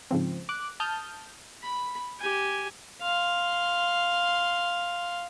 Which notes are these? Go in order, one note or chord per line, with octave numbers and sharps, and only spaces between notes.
G#2 C#3 F3 C4
D6 F#6
A5 D#6 F6 G6
B5
G4 G#5
F5 C6